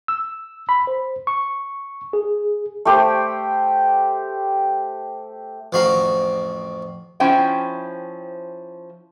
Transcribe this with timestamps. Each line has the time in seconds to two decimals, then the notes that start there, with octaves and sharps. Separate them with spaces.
0.08 E6
0.69 B5
0.87 C5
1.27 C#6
2.13 G#4
2.85 A3 G4 C5
5.73 A1 F2 C4 F#4 F5 A#5
7.20 F3 C#4 E4 C5 E5 G5